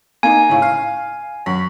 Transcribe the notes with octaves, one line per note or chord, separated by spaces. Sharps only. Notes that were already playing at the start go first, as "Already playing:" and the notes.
A#3 D#4 G#5
A2 C#3
F5
F#2